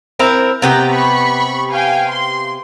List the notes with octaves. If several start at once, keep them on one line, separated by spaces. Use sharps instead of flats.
C4 E4 A#4
C3 B3 G4 A#5
B5 C#6
F5 G5 G#5
C6